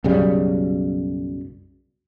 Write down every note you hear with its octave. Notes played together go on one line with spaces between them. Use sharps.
B1 F#2 C#3 G3